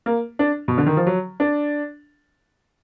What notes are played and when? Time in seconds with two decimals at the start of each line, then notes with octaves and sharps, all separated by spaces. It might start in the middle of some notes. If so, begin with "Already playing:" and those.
0.06 A#3
0.39 D4
0.68 B2
0.78 D3
0.86 D#3
0.97 F3
1.07 F#3
1.40 D4